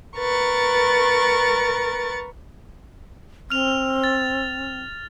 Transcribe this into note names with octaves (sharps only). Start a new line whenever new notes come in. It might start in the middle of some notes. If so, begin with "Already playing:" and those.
A#4 B4 C#6 A6
C4 F6 F7
A6